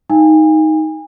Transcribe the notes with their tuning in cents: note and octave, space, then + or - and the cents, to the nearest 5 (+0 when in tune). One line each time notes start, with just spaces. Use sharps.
D#4 +10 F5 +10 G#5 -35